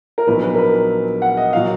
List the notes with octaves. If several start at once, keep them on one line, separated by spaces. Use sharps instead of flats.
A#4
A#1 A#2 F#3 B3 D#4 B4
B4
A#4
B4
F#5
D#5
A#2 F#3 F5